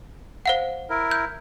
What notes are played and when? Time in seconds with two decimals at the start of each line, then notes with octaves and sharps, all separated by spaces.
0.46 C5 F5 F#5
0.90 E4 A#4
1.11 G6